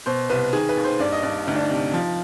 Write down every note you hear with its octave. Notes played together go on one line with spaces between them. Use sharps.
B2 C5
C2 B4
D#3 G#4
B4
D#2
C5
G2 D5
D#5
G2 D5
D2 D#4
D4
D#4
C3
F3